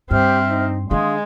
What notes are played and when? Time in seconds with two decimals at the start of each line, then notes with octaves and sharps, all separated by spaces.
0.11 G2 C4 G4 C5 E5 F6
0.48 D#4
0.91 D#3 G#3 D4 G#4 F5 C6 D#6